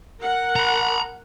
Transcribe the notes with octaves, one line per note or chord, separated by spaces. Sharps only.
A#4 F#5
A#5 B5